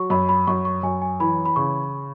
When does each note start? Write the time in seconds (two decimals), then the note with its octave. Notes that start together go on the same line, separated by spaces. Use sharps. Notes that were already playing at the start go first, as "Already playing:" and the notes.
Already playing: F#3 C#6
0.10 F#2 B5
0.29 B5
0.47 F#2 C#6
0.65 C#6
0.83 F#2 G#5
1.02 G#5
1.20 E3 B5
1.46 B5
1.56 C#3 C#6